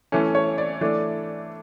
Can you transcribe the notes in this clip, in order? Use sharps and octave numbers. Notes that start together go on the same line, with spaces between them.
E3 A3 C#4
C#5
D5
E3 A3 D4